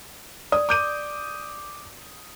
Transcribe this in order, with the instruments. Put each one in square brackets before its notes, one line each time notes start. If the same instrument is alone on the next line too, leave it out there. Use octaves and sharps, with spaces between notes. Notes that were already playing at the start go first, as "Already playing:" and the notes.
[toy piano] D5 [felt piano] D#6
[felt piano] D6 G6 D#7